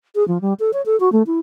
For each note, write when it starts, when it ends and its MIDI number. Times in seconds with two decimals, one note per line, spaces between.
0.15 0.26 68
0.28 0.41 53
0.41 0.54 55
0.60 0.71 69
0.73 0.82 73
0.86 0.98 69
1.00 1.12 66
1.12 1.23 57
1.27 1.39 64